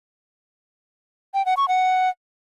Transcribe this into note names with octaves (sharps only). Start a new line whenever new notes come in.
G5
F#5
C#6
F#5